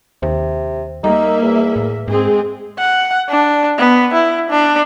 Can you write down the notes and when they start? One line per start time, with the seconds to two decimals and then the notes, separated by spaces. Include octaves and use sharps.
0.22 D#2 C3
1.04 G3 A#3 D#4 E5
1.42 E2
1.76 A2
2.08 G#2 G#3 C4 G#4
2.79 F#5
3.30 D4
3.78 B3
4.14 E4
4.50 D4